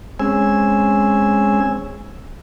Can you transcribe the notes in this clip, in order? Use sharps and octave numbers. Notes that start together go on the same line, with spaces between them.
G#3 C4 C#4 G#5 E6